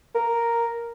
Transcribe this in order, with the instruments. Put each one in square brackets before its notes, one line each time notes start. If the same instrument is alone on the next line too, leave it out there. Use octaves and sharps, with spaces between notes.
[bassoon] A#4